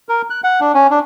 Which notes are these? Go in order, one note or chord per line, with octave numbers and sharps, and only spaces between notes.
A#4
F#6
F#5
D4
C#4
D4